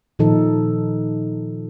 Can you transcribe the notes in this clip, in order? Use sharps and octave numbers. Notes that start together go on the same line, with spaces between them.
A#2 D#3 F3 D#4 A4